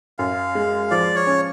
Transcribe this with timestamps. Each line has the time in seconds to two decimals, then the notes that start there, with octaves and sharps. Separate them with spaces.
0.18 F#2 F5
0.55 G#3
0.91 F3 D5
1.16 C#5
1.27 C#4